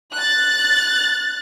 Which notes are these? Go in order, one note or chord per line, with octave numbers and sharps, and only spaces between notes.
F#6 A6